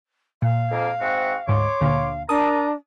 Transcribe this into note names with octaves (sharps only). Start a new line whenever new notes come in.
A#2 F5
F2 G#2 A#3
G#2 C4 F#4
D2 G#2 C#5 C6 D6
D2 A#2 D3 F5
D4 A#4 A5 A#5 D#6